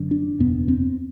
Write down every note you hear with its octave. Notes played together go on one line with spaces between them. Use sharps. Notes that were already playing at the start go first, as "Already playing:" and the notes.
Already playing: F#1 F#2 D3
D4
F#1 E2 B2 B3
C4